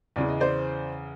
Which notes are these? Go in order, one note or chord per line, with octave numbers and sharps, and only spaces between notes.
E2 C#3 E3 D5
D#5
C5 D5